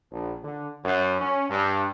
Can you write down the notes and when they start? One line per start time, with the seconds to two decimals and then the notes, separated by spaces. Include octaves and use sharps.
0.12 A#1
0.43 D3
0.84 F#2
1.21 C#4
1.50 G2